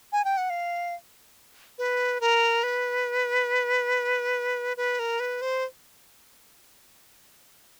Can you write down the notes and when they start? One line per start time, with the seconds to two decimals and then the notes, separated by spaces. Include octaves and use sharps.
0.12 G#5
0.25 G5
0.37 F#5
0.50 F5
1.78 B4
2.21 A#4
2.63 B4
4.77 B4
4.99 A#4
5.20 B4
5.42 C5